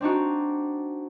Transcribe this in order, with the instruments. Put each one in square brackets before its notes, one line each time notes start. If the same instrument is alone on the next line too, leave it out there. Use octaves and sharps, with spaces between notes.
[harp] C4 D4 D#4 F#4